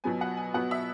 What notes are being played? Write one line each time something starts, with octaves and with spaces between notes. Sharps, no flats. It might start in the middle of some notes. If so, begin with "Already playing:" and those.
B2 F#3 B3 G#5
F#5
G#5
B2 F#3 B3 F#5
E5